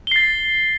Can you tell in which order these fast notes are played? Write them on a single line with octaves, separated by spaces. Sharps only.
G7 C7 A6